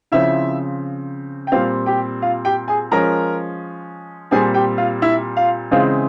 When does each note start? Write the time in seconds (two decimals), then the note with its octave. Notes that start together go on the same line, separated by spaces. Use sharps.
0.12 C#3 F3 C4 E4 E5
1.47 G5
1.52 A#2 G3 C4 F4 F5
1.86 G4 G5
2.22 F4 F5
2.45 G4 G5
2.68 G#4 G#5
2.92 F3 G#3 C#4 A#4 A#5
4.31 A#2 G3 C4 G#4 G#5
4.54 G4 G5
4.78 F4 F5
5.02 E4 E5
5.37 F4 F5
5.71 C#3 E3 G#3 C4 F4 F5